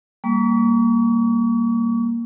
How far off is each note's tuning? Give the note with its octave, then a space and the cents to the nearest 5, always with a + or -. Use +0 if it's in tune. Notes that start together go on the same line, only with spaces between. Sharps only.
G3 +15 A#3 +0 C#6 +40